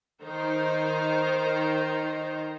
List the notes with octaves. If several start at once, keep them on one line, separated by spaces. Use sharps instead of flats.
D#3 D#4 C5 A#5